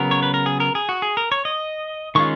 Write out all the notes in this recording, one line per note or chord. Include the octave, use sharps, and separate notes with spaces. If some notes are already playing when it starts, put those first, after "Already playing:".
Already playing: C#3 F#3 B3 A#4
C#5
B4
A#4
G#4
A#4
G#4
F#4
G#4
A#4
C#5
D#5
D#3 G#3 C#4 F4 C#6